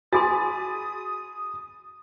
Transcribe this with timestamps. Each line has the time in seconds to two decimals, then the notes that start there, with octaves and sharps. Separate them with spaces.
0.13 F#4 G#4 G#5 B5 C6 D#6 A6